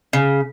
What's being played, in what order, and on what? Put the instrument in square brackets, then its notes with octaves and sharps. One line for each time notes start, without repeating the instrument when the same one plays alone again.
[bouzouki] C#3